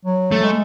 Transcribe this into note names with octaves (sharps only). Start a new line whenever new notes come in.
F#3
A3
G#3